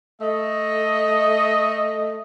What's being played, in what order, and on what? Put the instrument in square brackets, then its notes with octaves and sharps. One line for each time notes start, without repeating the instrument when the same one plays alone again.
[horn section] A3 D#5